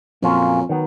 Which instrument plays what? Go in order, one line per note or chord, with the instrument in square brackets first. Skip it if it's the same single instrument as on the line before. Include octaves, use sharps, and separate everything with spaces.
[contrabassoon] F2 [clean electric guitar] A#2 F#3 A#3 C#4 F4
[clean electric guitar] D#3 F#3 B3